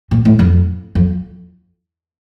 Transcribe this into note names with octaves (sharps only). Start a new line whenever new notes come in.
A#2
A2
F2
F2